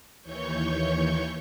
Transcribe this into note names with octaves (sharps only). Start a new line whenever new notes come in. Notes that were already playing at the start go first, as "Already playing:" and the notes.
D#2 E3 C#5 C#6 G6